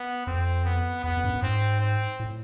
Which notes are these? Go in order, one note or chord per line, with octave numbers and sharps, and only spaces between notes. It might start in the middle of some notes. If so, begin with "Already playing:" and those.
Already playing: B3
F2 C4
B3
E2 B3
F2
G2
F#2
G#2 C4
C4
A2